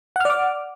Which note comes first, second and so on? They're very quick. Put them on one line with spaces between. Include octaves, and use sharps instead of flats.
F#5 F6 D5 D6